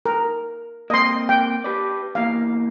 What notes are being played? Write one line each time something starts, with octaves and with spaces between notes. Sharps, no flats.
A#4
A#3 C4 D#5 C6
G5
G4 B4 D5
E2 A#3 F5